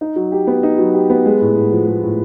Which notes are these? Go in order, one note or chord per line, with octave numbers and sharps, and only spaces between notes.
D#4
F#3
G4
B3
D#4
F#3
G4
B3
G#3
A2
A2
F3
G#3
A2